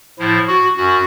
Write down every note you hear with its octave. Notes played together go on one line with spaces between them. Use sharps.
A2 F3 E4
F#4
F#2 F#4